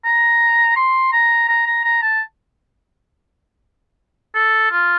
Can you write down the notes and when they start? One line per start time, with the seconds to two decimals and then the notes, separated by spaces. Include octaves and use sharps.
0.05 A#5
0.76 C6
1.12 A#5
1.48 A#5
1.66 A#5
1.84 A#5
2.02 A5
4.35 A4
4.71 F4